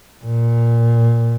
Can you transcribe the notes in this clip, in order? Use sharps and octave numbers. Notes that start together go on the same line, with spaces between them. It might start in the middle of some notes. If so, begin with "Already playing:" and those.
A#2